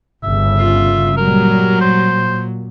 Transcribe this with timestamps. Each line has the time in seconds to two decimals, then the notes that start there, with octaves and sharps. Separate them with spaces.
0.24 G1 C#3 E5
0.58 F4
1.17 A#2 F#3 G3 A#4
1.81 A#2 C5